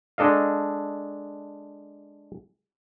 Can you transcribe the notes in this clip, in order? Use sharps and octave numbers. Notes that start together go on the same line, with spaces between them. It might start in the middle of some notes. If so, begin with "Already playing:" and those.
G#3 D4 A4 D#5 F5